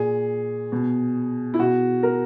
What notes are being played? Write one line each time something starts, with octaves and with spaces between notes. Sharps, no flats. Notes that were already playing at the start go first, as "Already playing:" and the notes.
Already playing: A#2 G#4
B2
E4
B2 F#4
A#4